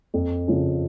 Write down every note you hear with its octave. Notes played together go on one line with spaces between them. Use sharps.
F2
C#3 F3